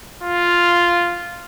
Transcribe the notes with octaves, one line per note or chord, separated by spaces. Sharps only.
F4